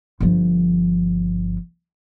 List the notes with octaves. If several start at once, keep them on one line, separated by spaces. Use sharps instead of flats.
G1 F3